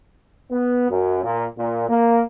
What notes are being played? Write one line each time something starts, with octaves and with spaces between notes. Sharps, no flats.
B3
F#2
A#2
A#2
A#3